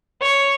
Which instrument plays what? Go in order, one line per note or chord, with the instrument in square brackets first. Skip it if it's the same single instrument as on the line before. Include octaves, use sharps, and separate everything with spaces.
[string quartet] C#5